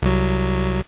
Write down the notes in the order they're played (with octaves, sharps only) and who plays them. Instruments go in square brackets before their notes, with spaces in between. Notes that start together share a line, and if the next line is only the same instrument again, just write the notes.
[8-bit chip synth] C2 F#3